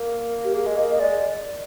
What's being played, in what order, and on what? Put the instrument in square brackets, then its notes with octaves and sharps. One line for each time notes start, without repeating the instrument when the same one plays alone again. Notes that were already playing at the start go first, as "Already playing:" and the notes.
Already playing: [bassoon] A#3
[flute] G4
[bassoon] A#3 [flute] G#4
[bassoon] G#3
[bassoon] A#3 [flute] D#5
[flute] D#5
[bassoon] G#3 [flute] D5